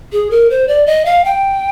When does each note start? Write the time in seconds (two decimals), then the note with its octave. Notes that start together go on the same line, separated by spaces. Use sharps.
0.12 G#4
0.31 A#4
0.50 C5
0.68 D5
0.86 D#5
1.05 F5
1.25 G5